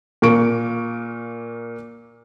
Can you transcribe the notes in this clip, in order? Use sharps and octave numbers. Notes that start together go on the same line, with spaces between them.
A#2 A#3 C#6 D7